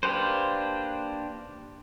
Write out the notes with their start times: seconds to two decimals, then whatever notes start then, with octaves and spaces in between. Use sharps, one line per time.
0.03 A#3 D4 G4 B4 C5